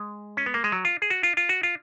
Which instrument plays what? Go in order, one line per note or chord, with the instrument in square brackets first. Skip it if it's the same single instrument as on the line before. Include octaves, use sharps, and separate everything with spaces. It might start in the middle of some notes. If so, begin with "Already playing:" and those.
Already playing: [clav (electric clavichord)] G#3
C#4
B3
A#3
G#3
F#3
F4
G#4
F#4
F4
F4
F#4
F4